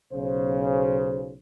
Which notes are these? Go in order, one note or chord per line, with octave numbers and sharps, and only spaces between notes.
B1 C#3 C5